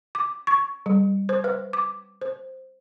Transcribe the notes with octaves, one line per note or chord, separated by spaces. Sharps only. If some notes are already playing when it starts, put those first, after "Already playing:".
D6
C#6
G3
C5
B4
D6
C5